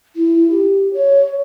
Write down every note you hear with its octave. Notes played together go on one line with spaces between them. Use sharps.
E4
G4
C#5